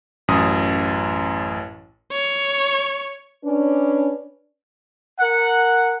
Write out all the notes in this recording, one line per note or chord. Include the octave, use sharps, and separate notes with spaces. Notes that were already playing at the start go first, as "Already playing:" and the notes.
A1 F#2 D#6
C#5
C#4 D4 B4
A#4 F#5